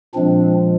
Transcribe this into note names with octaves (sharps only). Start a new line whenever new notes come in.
A#2 F3 G#3 C4 D4